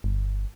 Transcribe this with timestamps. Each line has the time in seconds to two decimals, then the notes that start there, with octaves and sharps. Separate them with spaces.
0.04 G1